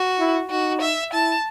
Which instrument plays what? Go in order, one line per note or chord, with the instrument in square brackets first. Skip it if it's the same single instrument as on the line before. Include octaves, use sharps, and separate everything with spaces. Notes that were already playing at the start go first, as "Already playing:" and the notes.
Already playing: [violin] F#4
[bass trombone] E4
[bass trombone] D#4 [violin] F#4
[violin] E5
[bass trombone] E4 [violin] A5